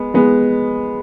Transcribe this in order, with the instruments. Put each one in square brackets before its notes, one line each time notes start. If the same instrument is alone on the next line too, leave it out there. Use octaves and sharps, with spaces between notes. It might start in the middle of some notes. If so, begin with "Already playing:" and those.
Already playing: [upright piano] G#3 B3
G#3 B3